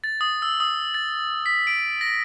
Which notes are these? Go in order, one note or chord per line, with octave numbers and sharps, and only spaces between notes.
A6
D#6
E6
D#6
A6
B6
D7
A#6